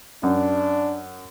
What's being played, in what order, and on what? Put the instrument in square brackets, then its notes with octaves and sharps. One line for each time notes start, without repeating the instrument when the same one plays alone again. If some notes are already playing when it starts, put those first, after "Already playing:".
[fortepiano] F#2 [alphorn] D4